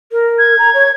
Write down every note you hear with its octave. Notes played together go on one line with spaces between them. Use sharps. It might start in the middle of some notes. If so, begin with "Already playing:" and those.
A#4
G#6
A#5
C#5